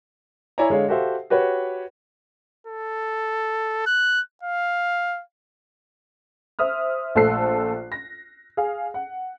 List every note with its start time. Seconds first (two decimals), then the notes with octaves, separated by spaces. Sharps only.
0.58 E4 C#5 D5 G#5 A#5
0.70 D3 G#3 C#5 F5
0.88 F#4 G4 A4 C5 E5 F5
1.30 F#4 G4 B4 C#5
2.67 A4
3.87 F#6
4.43 F5
6.59 C5 E5 D#6 F6
7.15 A#1 A3 A4 C5 F#6 C7
7.92 A#6
8.57 G#4 F5
8.94 F#5